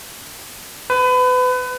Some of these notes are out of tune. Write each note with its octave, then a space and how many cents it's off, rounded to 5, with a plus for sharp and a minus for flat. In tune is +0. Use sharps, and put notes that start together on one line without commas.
B4 +30